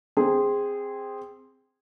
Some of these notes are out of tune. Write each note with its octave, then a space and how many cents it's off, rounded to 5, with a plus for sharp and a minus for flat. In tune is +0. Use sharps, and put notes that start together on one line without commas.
C4 +0 G#4 -15